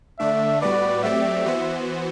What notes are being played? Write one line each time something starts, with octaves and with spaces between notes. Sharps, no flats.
D3 A3 D4 E5
A2 G3 B3 F#4 B4 D5
F#3 A3 C4 G4 D5 E5
E3 B3 F#4 C5